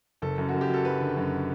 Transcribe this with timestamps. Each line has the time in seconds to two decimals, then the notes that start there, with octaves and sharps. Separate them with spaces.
0.22 F#1 A4
0.38 F#2
0.49 F#2 F#4
0.61 G4
0.69 F#3 A4
0.85 F#3 B4
1.00 D3
1.17 F#2